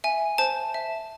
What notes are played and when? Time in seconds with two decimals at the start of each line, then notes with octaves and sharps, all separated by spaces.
0.04 E5 G#5
0.38 C5 A5
0.74 E5